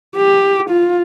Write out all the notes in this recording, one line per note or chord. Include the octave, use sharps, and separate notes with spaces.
G4
F4